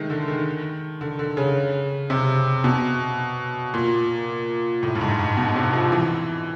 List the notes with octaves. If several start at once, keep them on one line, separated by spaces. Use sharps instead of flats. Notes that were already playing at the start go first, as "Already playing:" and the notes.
Already playing: D#3 G#3 A3
D3
D#3
D3
D3
C#3
C3
B2
A#2
A2
G2
G#2
G#2
B2
C3
F3
E3